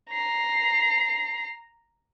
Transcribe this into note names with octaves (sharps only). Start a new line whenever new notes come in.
A#5 C7